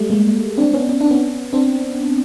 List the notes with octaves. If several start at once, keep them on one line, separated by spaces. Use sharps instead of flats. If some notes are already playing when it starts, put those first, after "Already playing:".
Already playing: G3 A3
G#3 A#3
C4 D4
B3 C#4
C#4
D4
B3 C#4
C4 D4